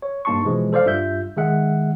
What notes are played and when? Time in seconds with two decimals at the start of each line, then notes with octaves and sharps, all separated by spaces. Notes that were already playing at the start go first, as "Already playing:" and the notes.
0.02 C#5
0.25 G2 A#3 D#4 A5 C6 C#6
0.45 B2 E3 F3 G#3
0.73 A4 C5 D5 F5
0.86 G2 F4 E5 G6
1.37 D#3 G#3 E5 F#5